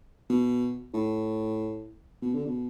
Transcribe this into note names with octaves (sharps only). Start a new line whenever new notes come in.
B2
A2
B2
D3
B2